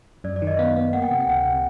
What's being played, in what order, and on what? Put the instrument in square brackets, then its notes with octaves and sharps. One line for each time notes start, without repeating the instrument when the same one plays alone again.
[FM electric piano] F#2 [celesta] D5
[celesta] D5
[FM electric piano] D#3
[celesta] D#5
[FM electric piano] B3 [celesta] F5
[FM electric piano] B3
[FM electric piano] A#3 [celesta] F#5
[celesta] G5
[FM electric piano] C3 [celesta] F#5
[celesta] G5
[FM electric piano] C#2 [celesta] F#5
[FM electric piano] C3